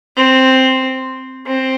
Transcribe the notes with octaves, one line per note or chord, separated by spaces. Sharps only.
C4
C4